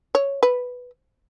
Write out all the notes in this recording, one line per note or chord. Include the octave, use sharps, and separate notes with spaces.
C#5
B4